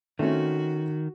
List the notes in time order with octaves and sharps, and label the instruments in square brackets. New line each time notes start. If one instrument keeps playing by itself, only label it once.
[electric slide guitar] D#3 [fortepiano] A3 C4 C#4 [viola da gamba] F#4